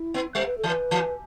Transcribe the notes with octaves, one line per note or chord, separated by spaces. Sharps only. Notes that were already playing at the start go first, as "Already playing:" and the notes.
Already playing: E4
B3
G3 C5
B4
A4
E3
B4
E3